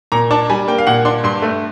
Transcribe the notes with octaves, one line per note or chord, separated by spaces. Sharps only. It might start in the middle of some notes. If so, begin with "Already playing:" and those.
A#2 A#5
D4 A5
G3 G#5
A#3 G5
F5
A#2 F#5
D4 C6
G2 C6
A3